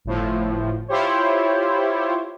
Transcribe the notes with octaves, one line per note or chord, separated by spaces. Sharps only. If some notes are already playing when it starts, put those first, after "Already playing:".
G1 A2 F3
E4 F4 G4 C5 C#5